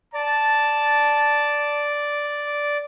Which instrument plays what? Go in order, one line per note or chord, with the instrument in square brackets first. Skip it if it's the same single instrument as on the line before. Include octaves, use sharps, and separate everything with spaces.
[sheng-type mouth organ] D5 [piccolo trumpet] A5